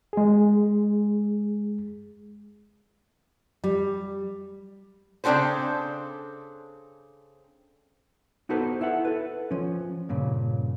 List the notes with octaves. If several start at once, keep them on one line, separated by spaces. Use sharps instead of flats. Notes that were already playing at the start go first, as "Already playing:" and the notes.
G#3 G#4
G3
C#3 C4 D4 F#4 A4 C5
B3 D#4 F#4 A4 B4 C5
E4 E5 F#5
A4 B4
F3 C#4
G2 A#2 C#3